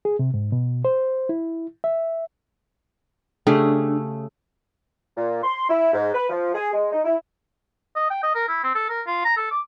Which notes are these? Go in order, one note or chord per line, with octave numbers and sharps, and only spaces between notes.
G#4
C3
G#2
B2
C5
E4
E5
C#3 A3 D4 G4 G#4
A#2
C6
E4
G#2
B4
F3
G#4
G#3
D#4
E4
D#5
G5
D#5
A#4
E4
C4
A4
A#4
F4
A#5
A4
D6